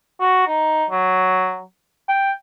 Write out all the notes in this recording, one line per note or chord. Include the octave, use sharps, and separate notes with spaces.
F#4
D#4
F#3
G5